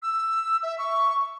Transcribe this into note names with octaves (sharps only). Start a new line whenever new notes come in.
E6
E5
C#6